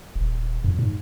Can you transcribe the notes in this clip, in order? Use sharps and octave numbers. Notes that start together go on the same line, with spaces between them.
D#1
F2
G#2